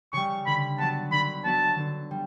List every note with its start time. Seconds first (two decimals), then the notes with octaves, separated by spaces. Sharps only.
0.13 C#3 G3 C#6
0.46 D3 B5
0.78 F#3 B3 A5
1.11 D3 B5
1.44 F#3 B3 A5
1.78 D3
2.11 G3